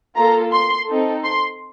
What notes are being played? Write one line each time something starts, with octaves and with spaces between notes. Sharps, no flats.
A#3 F4 A4 A#5
C6
C4 D#4 A4
C6